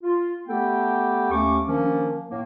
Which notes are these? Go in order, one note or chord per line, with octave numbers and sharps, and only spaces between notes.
F4
A3 B3 G4 A4 G5
D#2 A3 C#4 C#6 D6
D#3 F3 A#3 C#4 D4
A2 A#3